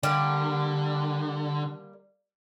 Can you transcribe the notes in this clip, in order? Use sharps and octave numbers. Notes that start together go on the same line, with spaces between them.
D3 G3 A#3